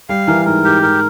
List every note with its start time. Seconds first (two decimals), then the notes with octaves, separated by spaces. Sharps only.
0.09 G3 F5
0.27 E3 A#4
0.46 G#2 A#4
0.64 G#2 G4
0.83 G#2 A#4